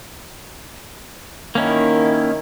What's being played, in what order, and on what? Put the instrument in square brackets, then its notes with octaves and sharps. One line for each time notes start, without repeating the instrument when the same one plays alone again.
[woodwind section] D#3 [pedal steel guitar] A#3 C#4 E4